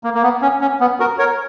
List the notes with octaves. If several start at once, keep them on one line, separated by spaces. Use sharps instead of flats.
A#3
A#3
B3
C#4
C#4
B3
F#4 A#4
A#4 C#5